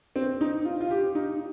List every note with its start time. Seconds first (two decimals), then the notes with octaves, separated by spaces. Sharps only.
0.16 C4
0.41 D#4
0.65 F4
0.81 F4
0.90 G4
1.15 D#4